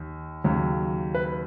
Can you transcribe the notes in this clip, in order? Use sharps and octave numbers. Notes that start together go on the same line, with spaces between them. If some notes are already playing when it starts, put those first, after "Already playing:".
Already playing: D#2
D#2 C#3 F#3
B4